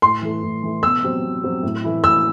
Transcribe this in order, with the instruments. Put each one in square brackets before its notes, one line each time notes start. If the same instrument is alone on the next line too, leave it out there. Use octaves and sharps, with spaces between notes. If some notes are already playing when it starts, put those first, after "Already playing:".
[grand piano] A2 [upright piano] C6
[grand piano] E3 A3
A2
E3 A3
[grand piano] B2 [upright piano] E6
[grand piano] F#3 C4 G4 C5
B2
F#3 C4 G4 C5
A2
E3 A3 E4
[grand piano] A2 [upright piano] E6